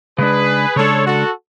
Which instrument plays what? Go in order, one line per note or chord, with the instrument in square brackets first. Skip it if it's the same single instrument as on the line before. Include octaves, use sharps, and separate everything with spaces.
[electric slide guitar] C#3 G#3 D4 [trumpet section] G#4 B4
[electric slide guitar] C#3 G#3 D4 [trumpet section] A4 C#5
[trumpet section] F#4 A4